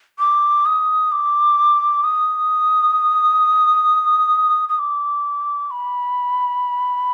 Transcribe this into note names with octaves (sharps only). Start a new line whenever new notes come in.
D6
D#6
D6
D#6
D#6
D6
B5